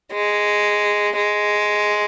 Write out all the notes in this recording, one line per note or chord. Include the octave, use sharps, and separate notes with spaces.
G#3
G#3